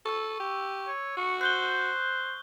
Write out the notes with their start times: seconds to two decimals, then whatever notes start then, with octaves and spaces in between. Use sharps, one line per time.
0.06 A4 C#6 E6
0.40 G4
0.87 C#5
1.17 F#4 C#6
1.41 C5 F#6 G6 G7